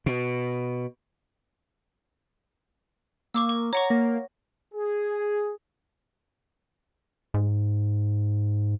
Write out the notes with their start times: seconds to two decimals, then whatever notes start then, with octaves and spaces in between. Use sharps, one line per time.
0.06 B2
3.34 A#3 C#6 D6 E6
3.49 C#6
3.73 C#5 F#5 A#5 C#6
3.90 A#3 A#6
4.74 G#4
7.34 G#2